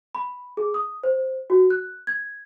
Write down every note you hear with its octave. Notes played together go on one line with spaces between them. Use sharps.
B5
G#4
D#6
C5
F#4
F#6
G#6